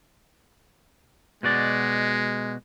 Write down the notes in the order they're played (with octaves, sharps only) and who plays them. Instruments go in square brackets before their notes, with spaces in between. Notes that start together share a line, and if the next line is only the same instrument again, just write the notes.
[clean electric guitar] B2 F#4 D5 [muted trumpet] G#3